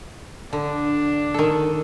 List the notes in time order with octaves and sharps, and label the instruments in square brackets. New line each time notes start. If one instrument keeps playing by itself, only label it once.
[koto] D3 [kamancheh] D4
[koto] D#3 A4